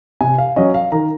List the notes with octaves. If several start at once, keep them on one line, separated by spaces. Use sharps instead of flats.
C3 G#5
F5
F#3 C#4 D#5
F5
D#3 A#5